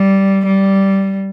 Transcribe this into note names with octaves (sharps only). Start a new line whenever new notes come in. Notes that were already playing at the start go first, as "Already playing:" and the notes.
Already playing: G3
G3